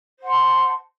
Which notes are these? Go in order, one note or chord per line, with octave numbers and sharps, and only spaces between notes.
C5 F#5 A5 C6